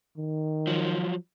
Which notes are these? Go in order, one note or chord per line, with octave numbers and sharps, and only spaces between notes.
D#3
F3 F#3